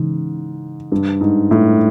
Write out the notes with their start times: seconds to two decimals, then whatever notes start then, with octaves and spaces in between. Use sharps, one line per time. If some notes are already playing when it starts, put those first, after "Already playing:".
Already playing: G#2 C#3 E3
0.92 G2
1.21 G#2
1.51 A2